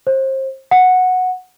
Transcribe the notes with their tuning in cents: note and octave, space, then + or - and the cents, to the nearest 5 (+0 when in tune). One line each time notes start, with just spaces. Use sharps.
C5 +30
F#5 -10